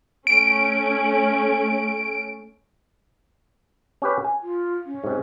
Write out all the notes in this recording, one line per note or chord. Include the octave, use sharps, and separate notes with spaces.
A3 C#4 D7
C#4 G4 B4
G#5
F4
C#4
G#2 C3